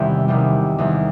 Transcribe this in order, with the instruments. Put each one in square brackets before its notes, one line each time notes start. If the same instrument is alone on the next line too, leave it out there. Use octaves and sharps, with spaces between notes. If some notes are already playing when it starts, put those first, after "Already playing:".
Already playing: [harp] E2 C3 D#3 G3
E2 C3 D#3 G3
E2 C3 D#3 G3